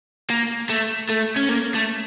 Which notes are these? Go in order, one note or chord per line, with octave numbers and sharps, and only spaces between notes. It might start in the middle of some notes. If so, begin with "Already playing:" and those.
A#3
A3
A3
C#4
A#3
A3